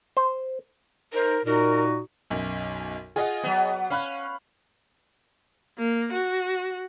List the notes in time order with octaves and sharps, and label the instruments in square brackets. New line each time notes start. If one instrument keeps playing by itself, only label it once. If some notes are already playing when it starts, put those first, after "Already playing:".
[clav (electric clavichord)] C5
[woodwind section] D#4 C5 [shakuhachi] A#4
[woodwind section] A#2 D#4 F#4 [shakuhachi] A#4
[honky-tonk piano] B1 F#2
[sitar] F4 [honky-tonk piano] G#4 D#5 F#5
[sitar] F#3 B3
[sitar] C#4 [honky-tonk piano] F5 B5 F#6
[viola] A#3
F#4